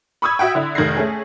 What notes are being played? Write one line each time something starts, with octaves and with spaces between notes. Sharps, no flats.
B5 C#6 D#6 E6 G#6
F#4 E5 F#5 G5
D3 E4
F1 D#3 G#6 A#6 C7
A3 C#4 G#4